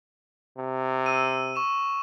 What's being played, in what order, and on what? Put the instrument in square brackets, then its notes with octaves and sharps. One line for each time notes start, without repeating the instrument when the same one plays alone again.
[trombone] C3
[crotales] E6 D#7
C#6 E7